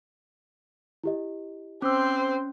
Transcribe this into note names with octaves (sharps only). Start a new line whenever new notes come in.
E4 G4 D#5
C4 C#4 C5 D6 E6